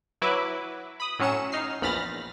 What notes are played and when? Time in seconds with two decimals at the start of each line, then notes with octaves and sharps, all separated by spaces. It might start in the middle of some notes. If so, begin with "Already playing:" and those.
0.22 F#3 E4 B4 D6
1.00 B5 D#6
1.19 A2 F#3 C#4 C#7 E7
1.52 D#4 F6 C7
1.82 A#1 E2 B5 F6 A6 A#6